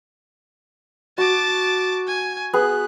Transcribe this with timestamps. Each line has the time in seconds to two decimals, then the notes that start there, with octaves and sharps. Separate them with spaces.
1.18 F#4 A5 D6
2.08 G#5
2.54 B3 G#4 F#6